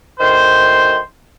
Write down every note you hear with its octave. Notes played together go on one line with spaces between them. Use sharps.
D2 D#3 C5